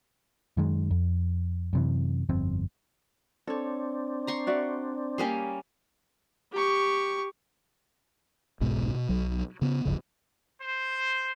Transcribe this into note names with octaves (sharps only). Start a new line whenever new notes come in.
F#2 D#3 G#3
F2
F#2 C3 E3
G1 F2 C4
C4 D4 A4 C#5
A#5 C6 C#6
F#4 D5 E5
G3 A#3 C#4 G4 G#4
G4 C#6
F1 B1 G#2 B2
B2
B1 F#3
C#3 B3
D1 G1 F2 C#3
C5